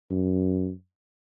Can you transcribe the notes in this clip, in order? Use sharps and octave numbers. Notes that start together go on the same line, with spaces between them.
F#2